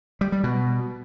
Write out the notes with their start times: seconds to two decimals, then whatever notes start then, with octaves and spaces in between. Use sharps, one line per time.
0.21 G3
0.32 G3
0.43 B2